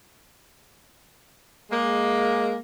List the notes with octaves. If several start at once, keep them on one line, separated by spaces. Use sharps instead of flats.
G#3 A#3